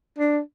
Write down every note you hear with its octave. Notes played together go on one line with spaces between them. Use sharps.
D4